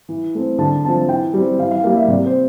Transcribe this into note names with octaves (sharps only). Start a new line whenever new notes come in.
E3
A3 C4
D3 A5
F3 C4 A5
E3 G5
G3 C4
E3 F5
F5
G3 A#3 F5
E5
C3 D5
C5